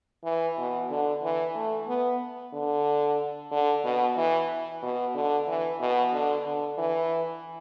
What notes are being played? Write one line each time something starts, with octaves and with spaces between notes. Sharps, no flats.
E3
B2
D3
E3
A3
B3
D3
D3
B2
E3
B2
D3
E3
B2
D3
D3
E3